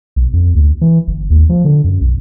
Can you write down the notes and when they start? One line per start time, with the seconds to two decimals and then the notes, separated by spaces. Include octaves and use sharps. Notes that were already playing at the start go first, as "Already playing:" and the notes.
0.16 B1
0.33 F2
0.55 D2
0.81 E3
1.08 G1
1.30 D#2
1.50 F3
1.65 D3
1.84 F#2
2.01 B1